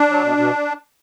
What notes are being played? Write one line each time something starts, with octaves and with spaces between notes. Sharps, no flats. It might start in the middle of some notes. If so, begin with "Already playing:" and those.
Already playing: D4
F#3
B2
B2